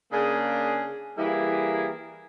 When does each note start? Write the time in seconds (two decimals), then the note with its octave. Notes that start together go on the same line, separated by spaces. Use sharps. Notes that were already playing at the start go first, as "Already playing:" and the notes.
0.11 C#3 A#3 D4 G#4
1.17 E3 G3 A#3 E4 G#4 A#4